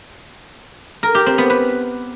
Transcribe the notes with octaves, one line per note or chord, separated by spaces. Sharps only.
A#4
G4
C4
B3
B4